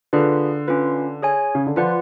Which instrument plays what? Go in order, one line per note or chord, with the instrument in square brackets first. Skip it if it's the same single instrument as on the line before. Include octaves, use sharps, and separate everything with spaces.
[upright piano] D3 [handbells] F4 G#4 B4
[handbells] C#4 F4 B4
G#4 C#5 G#5
[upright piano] C#3
D3
[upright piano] F3 [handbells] F4 B4 D5 F#5